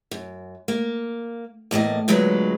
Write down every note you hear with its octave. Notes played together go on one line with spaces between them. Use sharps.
F#2
A#3
E2 A2 A#3 D#5
D2 A#2 F#3 G#3 B4